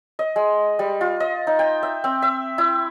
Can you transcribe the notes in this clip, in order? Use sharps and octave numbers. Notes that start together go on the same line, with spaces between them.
D#5
G#3
G3
F4
D#5
D#4
G5
E5
C4
E5
E4